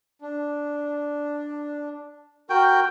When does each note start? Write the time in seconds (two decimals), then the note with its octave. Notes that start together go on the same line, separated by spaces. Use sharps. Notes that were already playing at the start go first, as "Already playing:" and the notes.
0.22 D4
2.50 F#4 A#4 G5